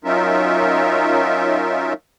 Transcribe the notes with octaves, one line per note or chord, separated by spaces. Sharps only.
F#3 C#4 D#4 F4 A#4 E5